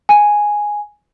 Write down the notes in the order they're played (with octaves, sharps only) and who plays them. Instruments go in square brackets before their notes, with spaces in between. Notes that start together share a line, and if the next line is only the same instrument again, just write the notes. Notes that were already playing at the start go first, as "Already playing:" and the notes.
[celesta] G#5